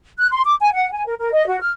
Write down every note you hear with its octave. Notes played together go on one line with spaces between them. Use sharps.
F#6
C6
D6
G#5
F#5
G#5
A#4
A#4
D#5
F#4
F6